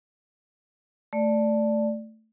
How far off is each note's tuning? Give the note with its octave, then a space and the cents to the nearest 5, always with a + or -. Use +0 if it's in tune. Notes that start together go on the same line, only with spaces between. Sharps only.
A3 +0 D5 +0